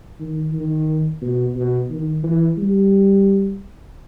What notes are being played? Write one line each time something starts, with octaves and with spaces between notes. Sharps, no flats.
D#3
D#3
B2
B2
D#3
E3
G3